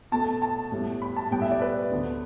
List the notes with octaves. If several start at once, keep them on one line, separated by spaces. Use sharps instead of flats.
B2 A3 A5
A5
A2 G3 B3
B5
A5
A2 G3 B3 G5
E5
D5
B4
D2 D3 B3